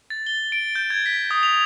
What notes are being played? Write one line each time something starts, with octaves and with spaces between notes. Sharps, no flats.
A6
G7
D7
G6
G#6
B6
D#6
F7